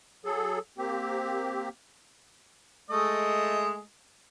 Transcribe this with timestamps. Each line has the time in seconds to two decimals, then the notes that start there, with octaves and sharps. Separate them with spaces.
0.25 F#3 G#4 A4
0.78 A#3 C4 G4
2.90 G#3 A3 D#5